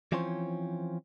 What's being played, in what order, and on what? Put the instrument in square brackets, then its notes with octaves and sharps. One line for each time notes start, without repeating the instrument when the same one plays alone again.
[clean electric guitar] E3 F3 C4 C#4 C5 C#5